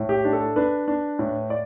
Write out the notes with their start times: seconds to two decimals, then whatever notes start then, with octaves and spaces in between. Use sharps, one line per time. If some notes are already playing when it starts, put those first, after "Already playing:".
Already playing: A2
0.09 G4
0.25 D4
0.33 A4
0.56 D4 B4
0.88 D4
1.19 A2
1.50 D5